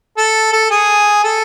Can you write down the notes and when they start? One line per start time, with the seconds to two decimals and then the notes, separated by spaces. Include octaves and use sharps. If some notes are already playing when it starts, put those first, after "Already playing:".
0.17 A4
0.53 A4
0.70 G#4
1.24 A4